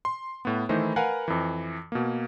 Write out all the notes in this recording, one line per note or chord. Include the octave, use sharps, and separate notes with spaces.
C6
A2 B3
D#3 E3 A3 D#4 E4 C5
A#4 B4 F5 F#5 G#5
F2 E3
B2 A#3